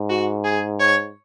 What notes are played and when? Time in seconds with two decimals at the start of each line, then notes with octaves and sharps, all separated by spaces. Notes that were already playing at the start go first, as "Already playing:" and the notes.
Already playing: G#2
0.10 F#4
0.44 G#4
0.80 C#5